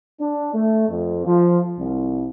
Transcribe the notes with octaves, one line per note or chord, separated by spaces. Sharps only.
D4
A3
F2
F3
C2